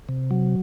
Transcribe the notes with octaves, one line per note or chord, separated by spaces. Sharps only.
C3
F#3